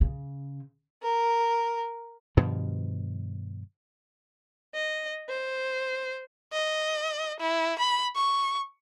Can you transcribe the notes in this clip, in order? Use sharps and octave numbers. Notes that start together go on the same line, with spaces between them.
C#3
A#4
G2 B2 D#3 F3
D#5
C5
D#5
E4
B5
C#6